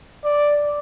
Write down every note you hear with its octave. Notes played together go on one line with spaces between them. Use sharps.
D5